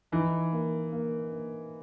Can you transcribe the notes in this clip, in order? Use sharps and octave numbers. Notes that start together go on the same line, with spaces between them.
E3 D#4
A#3
A#3
A#3